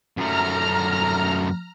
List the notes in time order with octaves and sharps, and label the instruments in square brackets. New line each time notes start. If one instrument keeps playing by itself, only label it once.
[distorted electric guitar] F#2 A3 [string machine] A#5 F6